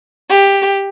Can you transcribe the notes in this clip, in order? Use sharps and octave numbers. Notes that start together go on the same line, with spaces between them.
G4